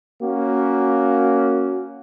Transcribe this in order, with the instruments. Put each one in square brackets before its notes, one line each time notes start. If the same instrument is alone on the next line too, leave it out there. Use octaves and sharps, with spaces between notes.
[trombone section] A#3 C#4 F#4